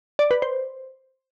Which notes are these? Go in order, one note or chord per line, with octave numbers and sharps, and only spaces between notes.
D5
B4
C5